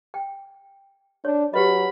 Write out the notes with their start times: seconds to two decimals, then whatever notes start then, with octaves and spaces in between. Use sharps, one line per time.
0.14 G5
1.25 D4 C#5
1.54 F#3 G4 B4 D#5 B5